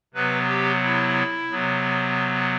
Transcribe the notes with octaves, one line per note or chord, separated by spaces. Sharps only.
C3 F#3 B3 B4
G4
E4
C3 F#3 B3